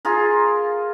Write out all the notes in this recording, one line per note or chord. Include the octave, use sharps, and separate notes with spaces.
F4 G#4 A#4